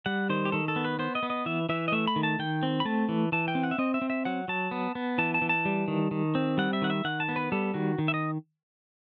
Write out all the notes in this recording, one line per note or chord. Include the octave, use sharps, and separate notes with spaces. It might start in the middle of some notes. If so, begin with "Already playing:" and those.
G3 F#5
D#3 C5
G4
D#3 A4
A4
B3
B4
B3 C5
D#5
B3
D#5
E3 E5
E3 E5
D#5
A3 E5
B5
D#3
A5
D#3 G5
C4
B5
A3 A5
E3
E3 A5
G5
C4
F#5
E5
C4 D#5
E5
C4
E5
F#3 F#5
F#3 A5
B3
B3
E3 A5
A5
E3
A5
G3
D#3
D#3
C4
G3 F#5
E5
D#3 F#5
E5
D#3 F#5
A5
B3
B4
G3 A4
D#3 F#4
D#3
E5
D#5